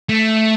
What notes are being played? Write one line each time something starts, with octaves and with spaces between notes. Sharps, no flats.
A3